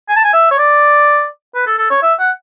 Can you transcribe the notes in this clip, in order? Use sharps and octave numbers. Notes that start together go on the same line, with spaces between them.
G#5
A5
G#5
E5
C#5
D5
B4
A4
A4
C#5
E5
F#5